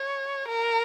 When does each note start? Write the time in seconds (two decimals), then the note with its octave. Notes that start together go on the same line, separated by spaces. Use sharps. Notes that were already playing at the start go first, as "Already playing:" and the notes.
Already playing: C#5
0.49 A#4